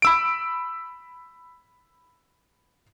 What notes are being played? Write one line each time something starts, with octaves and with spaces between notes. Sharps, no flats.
B5 E6 D7